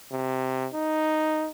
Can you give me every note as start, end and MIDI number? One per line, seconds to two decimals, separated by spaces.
0.12 0.68 48
0.74 1.49 63